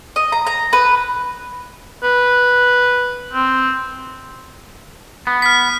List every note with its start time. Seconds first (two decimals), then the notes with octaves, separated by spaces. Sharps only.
0.16 D#5
0.32 A#5
0.47 A#5
0.73 B4
2.04 B4
3.33 C4
5.27 B3
5.42 F6 B6